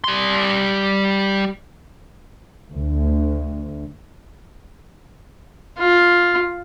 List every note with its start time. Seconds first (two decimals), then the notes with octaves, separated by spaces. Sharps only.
0.04 G3 C6
2.72 D2
5.79 F4